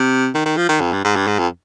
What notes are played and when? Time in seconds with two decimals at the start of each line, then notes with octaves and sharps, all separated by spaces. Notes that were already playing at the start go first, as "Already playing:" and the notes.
Already playing: C3
0.34 D#3
0.46 D#3
0.57 F3
0.69 D#3
0.80 F2
0.93 G2
1.04 G#2
1.16 G2
1.27 G#2
1.39 F2